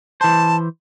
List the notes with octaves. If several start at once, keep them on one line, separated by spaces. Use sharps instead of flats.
E3 C5 A5